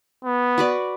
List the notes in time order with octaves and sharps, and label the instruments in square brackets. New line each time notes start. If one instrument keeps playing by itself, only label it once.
[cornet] B3
[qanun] F#4 B4 D5